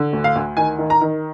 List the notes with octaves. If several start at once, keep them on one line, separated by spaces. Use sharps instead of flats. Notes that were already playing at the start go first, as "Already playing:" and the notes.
Already playing: D3
D2
F5
D2
D#3 G#5
D#3
A#5
D#3